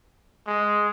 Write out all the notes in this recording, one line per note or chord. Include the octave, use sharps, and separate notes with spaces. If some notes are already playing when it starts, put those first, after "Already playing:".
G#3